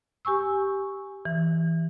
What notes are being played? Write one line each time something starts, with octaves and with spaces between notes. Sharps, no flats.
G4 G#5 C#6 E6
E3